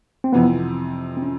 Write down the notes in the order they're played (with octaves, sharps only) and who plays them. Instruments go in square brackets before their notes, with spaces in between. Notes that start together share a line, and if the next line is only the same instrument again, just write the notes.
[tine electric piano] C4
[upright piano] F2 C3 E3 [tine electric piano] B3
[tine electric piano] C4
C#4